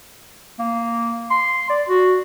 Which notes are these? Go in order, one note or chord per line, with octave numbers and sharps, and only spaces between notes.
A#3
C6
D5
F#4